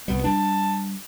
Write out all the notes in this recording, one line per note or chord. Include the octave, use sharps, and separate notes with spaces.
C2 G3 B3
G3 D4 A5